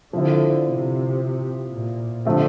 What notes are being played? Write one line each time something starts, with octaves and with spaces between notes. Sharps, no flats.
D3 F3 C4 E4
C3
A#2
D3 F3 A3 C4